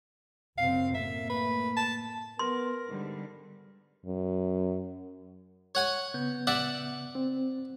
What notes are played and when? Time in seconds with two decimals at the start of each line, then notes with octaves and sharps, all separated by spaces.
0.58 F#1 C#3 C4 F5
0.94 A2 A#3 E5
1.30 B4
1.76 A5
2.39 B3 A#4 C6
2.88 G#2 D3 G3
4.06 F#2
5.75 C#5 F#5 G#5
6.14 C#3 B3 G6
6.47 D5 E5 F#5
7.15 C4